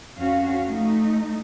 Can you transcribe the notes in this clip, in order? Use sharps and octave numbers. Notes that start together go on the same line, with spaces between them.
F2 C#4 F#4 F5
A3 D#4